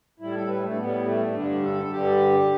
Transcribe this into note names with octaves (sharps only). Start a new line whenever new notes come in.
A2 G3 E4
A4
B4
A3
D4
A2 G3 B3
A3
G2 D3 G3 D4
A4
G2 D3 G3 G4